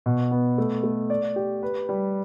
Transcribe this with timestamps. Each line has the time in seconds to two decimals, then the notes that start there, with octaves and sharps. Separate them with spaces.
0.06 B2
0.31 B3
0.58 A3
0.83 A3
1.10 D5
1.36 G4
1.63 B4
1.89 G3